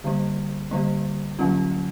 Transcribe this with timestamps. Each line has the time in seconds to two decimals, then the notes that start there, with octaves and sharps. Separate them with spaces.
0.04 D3 G3 A#3
0.71 D3 G3 A#3
1.39 D3 F#3 A#3 C#4 F4